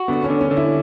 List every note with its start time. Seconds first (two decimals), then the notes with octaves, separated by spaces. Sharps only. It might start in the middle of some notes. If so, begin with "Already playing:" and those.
Already playing: F#4
0.08 D3 B3
0.24 C#4
0.30 D3
0.41 C#4
0.51 D3
0.57 E4